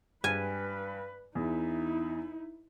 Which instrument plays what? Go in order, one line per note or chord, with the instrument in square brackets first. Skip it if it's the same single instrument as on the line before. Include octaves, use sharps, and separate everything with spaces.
[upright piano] G2 [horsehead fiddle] B4 [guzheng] G#5
[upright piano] E2 [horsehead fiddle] D#4 E4